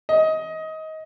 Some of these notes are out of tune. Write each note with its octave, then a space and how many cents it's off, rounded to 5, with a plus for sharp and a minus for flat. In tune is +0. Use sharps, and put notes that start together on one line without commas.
D#5 +20